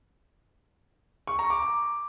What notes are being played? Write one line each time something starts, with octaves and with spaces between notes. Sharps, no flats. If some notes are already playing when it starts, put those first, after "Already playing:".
C#6
A#5
D6